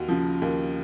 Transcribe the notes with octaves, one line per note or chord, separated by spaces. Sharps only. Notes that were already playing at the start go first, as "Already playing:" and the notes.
Already playing: D#2 F#4 A#4
C#3 F3
D#2